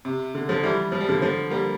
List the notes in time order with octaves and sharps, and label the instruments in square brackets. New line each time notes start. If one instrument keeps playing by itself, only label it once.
[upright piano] C3
D3
D3 F3
E3 G3
F3
G3
D3 F3
D3 F3
G3 A#3